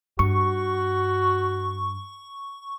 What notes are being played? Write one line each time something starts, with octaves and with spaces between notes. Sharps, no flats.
G2 F#4 C#6